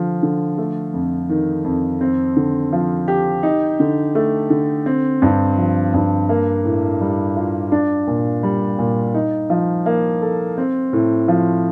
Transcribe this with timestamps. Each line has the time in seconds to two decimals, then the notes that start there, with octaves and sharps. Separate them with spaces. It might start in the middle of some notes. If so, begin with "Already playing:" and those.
Already playing: D3 F3
0.23 D3
0.58 A3
0.94 F2
1.29 D#3
1.65 F2
2.01 C4
2.36 D3
2.73 F3
3.08 G4
3.43 D#4
3.80 D3
4.15 A3
4.50 D3
4.86 C4
5.22 G2
5.58 F3
5.94 G2
6.29 A#3
6.65 A2
7.01 G3
7.36 F4
7.72 D4
8.07 A#2
8.43 G3
8.79 A#2
9.14 D#4
9.50 F3
9.86 A#3
10.22 A4
10.58 C4
10.93 A2
11.28 F3